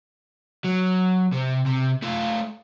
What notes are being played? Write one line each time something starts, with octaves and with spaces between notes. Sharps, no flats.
F#3
C3
C3
A3 F4